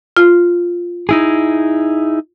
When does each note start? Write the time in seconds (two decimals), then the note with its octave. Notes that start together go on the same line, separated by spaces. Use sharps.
0.17 F4
1.09 D#4 E4 G#4